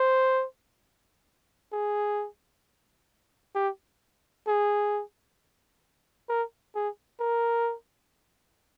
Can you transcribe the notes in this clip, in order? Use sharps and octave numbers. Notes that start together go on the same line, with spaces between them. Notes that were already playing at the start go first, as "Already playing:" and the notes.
Already playing: C5
G#4
G4
G#4
A#4
G#4
A#4